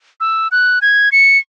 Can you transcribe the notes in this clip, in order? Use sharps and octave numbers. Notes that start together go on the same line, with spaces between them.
E6
F#6
G#6
C#7